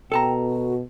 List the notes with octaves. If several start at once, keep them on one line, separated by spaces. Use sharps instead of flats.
B2 A4 G5 A5 A#5
F#4